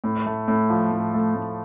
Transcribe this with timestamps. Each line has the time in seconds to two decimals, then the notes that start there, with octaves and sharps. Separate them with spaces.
0.04 A2
0.26 A3
0.48 A2
0.70 F3
0.91 A2
1.14 A3
1.35 A2